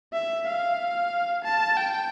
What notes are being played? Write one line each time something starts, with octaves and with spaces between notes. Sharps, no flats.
E5
F5
A5
G5